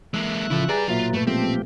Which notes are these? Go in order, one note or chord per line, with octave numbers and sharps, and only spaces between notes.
E3 G#3 A#3 E5 F#6
C#3 F3 E4 A4
G4 G#4 B4 D5 A#5 A6
B1 A#2 F#3 F4 E5
G2 A3 B4
F3 G#3 A3 B3 C4 G4